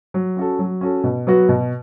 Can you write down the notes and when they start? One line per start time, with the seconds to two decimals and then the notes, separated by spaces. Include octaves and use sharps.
0.14 F#3
0.37 C#4 F#4 A4
0.59 F#3
0.81 C#4 F#4 A4
1.04 B2
1.27 F#3 B3 F#4
1.49 B2